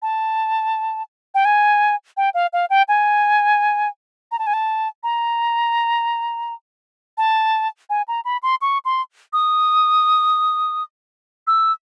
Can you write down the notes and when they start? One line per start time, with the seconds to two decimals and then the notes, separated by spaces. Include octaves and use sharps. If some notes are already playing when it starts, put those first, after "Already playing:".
0.02 A5
1.34 G5
1.45 G#5
2.17 G5
2.34 F5
2.53 F5
2.70 G5
2.88 G#5
4.32 A#5
4.39 A5
4.47 G#5
4.54 A5
5.03 A#5
7.18 A5
7.90 G#5
8.08 A#5
8.25 B5
8.43 C6
8.61 C#6
8.85 C6
9.33 D#6
11.47 E6